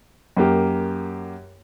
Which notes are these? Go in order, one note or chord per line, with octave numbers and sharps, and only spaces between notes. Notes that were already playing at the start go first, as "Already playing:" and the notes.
F#2 A#3 G4